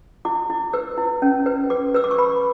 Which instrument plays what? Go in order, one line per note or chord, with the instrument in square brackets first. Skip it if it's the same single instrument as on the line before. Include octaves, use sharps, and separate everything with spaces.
[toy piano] E4 D6
E4
B4 E6
E4
C#4
B4
B4 D6
B4 E6
D6
C#6
B4 B5